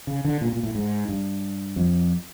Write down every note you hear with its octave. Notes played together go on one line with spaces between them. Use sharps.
C#3
D3
A#2
A#2
A2
G#2
G2
F2